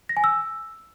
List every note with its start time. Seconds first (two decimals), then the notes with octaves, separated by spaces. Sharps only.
0.09 A#6
0.17 G#5
0.24 E6